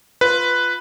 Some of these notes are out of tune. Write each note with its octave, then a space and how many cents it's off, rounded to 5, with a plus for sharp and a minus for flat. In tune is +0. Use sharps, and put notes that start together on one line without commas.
F4 +0 B4 +0